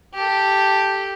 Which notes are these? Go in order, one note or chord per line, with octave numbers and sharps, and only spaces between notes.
G4 A4